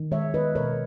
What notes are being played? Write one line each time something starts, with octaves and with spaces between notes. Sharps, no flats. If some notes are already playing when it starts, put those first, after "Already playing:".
Already playing: D#3
G#3 C#5 E5
B4 D#5
B2 A#4 C#5